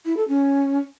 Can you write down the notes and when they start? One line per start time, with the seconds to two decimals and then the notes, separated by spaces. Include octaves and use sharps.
0.05 E4
0.17 A4
0.28 C#4